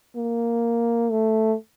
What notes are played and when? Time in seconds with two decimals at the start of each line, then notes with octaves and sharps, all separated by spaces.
0.16 A#3
1.11 A3